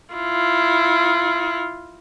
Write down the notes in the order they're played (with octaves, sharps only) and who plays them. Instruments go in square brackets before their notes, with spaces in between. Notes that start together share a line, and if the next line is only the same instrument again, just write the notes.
[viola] E4 F4